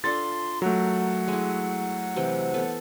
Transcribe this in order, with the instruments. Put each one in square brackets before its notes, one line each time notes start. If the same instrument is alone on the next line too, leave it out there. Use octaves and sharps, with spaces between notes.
[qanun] D4 F4 A4 [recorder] C6 [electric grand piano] A6
[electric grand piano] F#3 A3 [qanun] A#4 [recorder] F#5
[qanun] G#3 E4
C3 E3 G5
B3 A4